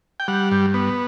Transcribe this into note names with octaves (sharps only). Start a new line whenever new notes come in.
G5
G3 F#5
G2
B3